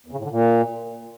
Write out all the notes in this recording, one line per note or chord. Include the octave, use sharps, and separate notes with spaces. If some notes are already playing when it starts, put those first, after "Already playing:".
E2
C#3
A2
D3
A#2